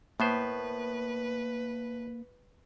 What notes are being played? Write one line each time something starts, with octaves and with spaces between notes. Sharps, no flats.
A2 A#3 B3 B4 C5